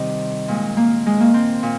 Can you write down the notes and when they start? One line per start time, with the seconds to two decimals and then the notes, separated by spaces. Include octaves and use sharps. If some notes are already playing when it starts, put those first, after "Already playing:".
Already playing: C3 D#3 G3 C4
0.48 A#2 G#3
0.77 A#3
1.06 G#3
1.20 A#3
1.34 C4
1.63 A#2